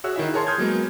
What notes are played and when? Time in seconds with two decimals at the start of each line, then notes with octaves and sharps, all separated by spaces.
0.04 F#4 G#4 C#5 E5 E6 F#6
0.16 D#3 E4 E5
0.33 G#4 A#4 C#5 A5 C6
0.47 C6 D#6 F6 G6 G#6
0.58 F#3 G#3 A#3 B3